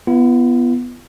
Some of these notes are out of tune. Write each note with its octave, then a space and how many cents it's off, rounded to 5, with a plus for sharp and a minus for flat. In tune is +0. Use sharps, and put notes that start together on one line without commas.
B3 -5 F4 -45